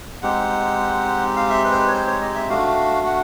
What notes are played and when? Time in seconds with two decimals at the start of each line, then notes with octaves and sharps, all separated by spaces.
0.22 G#3 C4 D#4 G4 F#5
1.36 F5
1.50 E5
1.64 B4
1.72 C5
1.78 B4
1.88 C#5
1.93 C5
2.07 C#5
2.21 D#5
2.35 E5
2.49 A3 D4 F#4 F5
3.06 F#5